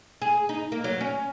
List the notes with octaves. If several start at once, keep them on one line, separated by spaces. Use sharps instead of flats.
G#4
D#4
A#3
F#3
C#4